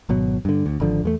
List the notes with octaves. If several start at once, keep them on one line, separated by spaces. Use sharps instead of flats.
G#1 B2 F#3
G2 D3
D2
G#1 D3 F3
E2 G#3 A3